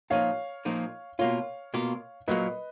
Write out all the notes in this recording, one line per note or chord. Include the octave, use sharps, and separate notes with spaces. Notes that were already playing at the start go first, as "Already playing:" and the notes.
A#2 F3 A#3 D#4 C#5 F5
A#2 F3 A#3 D#4
B2 A#3 F4 C#5 F5
B2 A#3 F4
A#2 F#3 A#3 B4 D#5